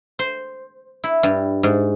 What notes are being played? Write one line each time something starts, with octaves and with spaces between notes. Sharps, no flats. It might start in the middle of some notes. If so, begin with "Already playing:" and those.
C5
E4
G2
G#2